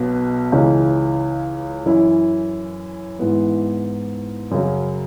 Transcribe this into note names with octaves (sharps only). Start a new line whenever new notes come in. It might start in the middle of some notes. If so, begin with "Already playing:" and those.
Already playing: B1 B2 B3
C#2 C#3 E3 C#4
F#2 E3 C#4 E4
G#2 E3 B3 E4
F#2 C#3 F#3